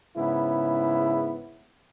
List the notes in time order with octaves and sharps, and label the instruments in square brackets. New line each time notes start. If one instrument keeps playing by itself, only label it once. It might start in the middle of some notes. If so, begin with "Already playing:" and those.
[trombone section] G#2 C#3 B3 E4